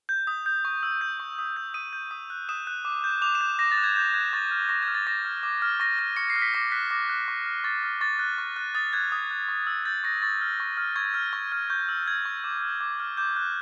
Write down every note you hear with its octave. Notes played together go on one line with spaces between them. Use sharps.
G6
D#6
G6
C#6
E6
G6
C#6
D#6
G6
D#6 D#7
G6
D#6
F#6
D#6 E7
F#6
D6
G6
D6 F7
E7
G6
D6 A#6
A6
F#6
G#6
D6 G6
F#6 G#6
C#6 A6
F6
C#6 A#6
G#6
F6
A6
D6 A#6
F6
D6
F6
C#6 A#6
F6
C#6 C#7
C7
F6
B6
D6 A#6
F#6 B6
D6 A#6
F#6
C#6
F6
C#6 A6
F6
C#6 A6
F#6
C#6
F#6
D#6 A6
F#6 G#6
D#6
F#6
C#6
E6
G6 A6
C#6 A#6
C#6 A6
F6
C#6
F6
C#6 G#6
F6
C#6
F6
C#6 G6
E6
G6 G#6
C#6
D6
F6
D6
F6
D6 G6
F#6